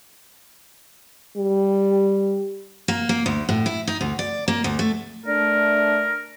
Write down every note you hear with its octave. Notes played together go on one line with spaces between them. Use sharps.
G3
A#3
A#3
D2
A2
E4
D#4
D2
D5
A#3
D2
A3
A3 D4 A#4 D5